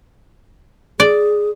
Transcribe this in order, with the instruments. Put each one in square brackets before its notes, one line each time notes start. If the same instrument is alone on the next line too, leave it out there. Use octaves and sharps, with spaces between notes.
[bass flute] G#4 [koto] D5